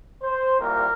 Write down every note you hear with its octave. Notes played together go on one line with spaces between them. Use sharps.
C5
C2 A#2 G3 A#3 A#4